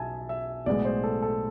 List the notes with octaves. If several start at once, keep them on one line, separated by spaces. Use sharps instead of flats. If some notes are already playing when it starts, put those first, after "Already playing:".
Already playing: B1 B2 B3 E5 G#5 A5
E5
B1 A2 G#3 B3 D5
C5
A4
A4